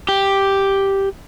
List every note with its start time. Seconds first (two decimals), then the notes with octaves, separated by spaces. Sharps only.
0.09 G4